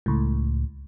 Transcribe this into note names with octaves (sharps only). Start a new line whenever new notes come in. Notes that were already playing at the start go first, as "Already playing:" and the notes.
C#2 A2